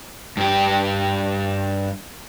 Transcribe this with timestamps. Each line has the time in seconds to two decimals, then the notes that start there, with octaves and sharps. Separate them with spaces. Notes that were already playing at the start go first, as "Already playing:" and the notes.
0.37 G2 G4